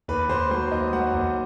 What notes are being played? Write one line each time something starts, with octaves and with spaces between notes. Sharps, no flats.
D#2 B4
D#2 C5
F#3 C5
D#2 D#5
F#3 F#5
D#2